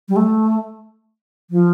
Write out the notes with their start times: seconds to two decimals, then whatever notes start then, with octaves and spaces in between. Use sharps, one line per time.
0.09 G3
0.16 A3
1.50 F3